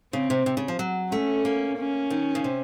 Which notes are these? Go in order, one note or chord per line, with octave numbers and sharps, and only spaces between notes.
C#3 C4
C3
C3
C#3
F3
F#3
A3 C#4
A#3
C#4
D#3
C#3
C3